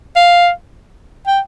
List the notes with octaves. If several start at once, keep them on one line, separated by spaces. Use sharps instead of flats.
F5
G5